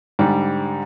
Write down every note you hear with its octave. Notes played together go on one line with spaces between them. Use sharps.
G#2 D3 G3